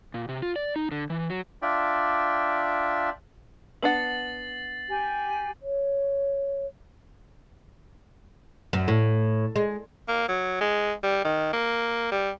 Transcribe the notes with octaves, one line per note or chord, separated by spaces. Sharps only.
A#2
C3
F4
D5
D#4
D3
E3
F#3
D4 F4 D5 E5 G5
B3 D4 F#5 A6 C7 F#7
G4 G#5
C#5
F#2
A2
G#3
A#3
F#3
G#3
G3
D#3
A#3
G3